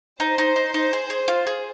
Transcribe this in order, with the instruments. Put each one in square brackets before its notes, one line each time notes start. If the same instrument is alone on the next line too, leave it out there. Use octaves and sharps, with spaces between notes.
[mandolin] D#4 [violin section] C5
[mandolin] D#4
D#4
D#4
G#4
G#4
F4
G#4